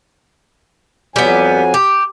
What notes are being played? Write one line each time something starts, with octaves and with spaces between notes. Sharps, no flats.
F2 F#3 G3 B3 G#5
G4